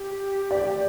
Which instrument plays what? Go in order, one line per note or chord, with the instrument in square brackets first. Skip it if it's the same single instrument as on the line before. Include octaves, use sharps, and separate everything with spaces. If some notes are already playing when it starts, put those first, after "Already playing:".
Already playing: [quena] G4
[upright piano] D5